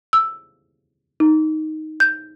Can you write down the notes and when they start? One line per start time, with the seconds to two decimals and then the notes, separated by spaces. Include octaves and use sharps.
0.13 E6
1.20 D#4
2.00 G6